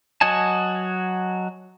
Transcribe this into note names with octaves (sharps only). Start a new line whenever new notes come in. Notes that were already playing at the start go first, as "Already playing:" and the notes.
F#3 F#4 D#5 G#5 A5